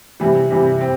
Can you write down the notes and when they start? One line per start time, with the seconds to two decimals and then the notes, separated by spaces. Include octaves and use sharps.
0.20 C3 E3 G3
0.51 C3 E3 G3
0.81 C4